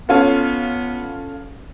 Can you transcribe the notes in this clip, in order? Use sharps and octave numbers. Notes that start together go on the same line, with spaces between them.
B3 C#4 F4 A4